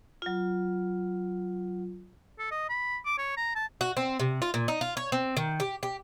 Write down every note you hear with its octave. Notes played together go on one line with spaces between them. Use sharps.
F#3 F4
A4
D#5
B5
D6
C#5
A#5
A5
F#4
C4
C3
F4
A#2
D#4
F4
C#5
C4
D#3
G4
G4